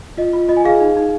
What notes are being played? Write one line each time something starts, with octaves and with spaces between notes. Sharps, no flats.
F4 D#5
F4
F4 D#5
G#5
G#4 F5
D#4
D#4